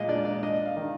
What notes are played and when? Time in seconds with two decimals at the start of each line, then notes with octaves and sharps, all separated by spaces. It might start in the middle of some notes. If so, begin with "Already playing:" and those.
Already playing: A#2 G#3 D#5 F5
0.09 D4 D5
0.25 D5
0.43 D4 D#5
0.65 F5
0.77 D#3